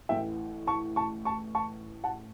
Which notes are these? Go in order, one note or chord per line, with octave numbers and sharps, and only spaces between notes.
A1 A2 E3 E5 G5
A5 C#6
A5 C#6
A5 C#6
A5 C#6
F#5 A5